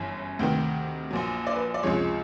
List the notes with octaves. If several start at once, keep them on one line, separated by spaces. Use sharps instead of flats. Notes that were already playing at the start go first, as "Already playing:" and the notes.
Already playing: G1 F#2 E3
D2 C3 D#3 G5
A#1 A#2 F#3
D5
B4
D5
C#2 C3 F3 G#3 C#5